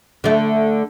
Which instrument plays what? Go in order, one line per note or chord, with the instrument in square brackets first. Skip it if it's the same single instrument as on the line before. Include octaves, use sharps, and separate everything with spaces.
[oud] D3 A3